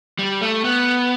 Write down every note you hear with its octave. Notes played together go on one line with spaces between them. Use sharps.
G3
A3
B3